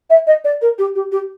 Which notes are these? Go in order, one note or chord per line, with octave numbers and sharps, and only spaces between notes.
E5
D#5
D5
A#4
G4
G4
G4